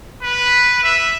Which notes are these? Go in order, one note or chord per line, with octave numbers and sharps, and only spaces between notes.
B4
E5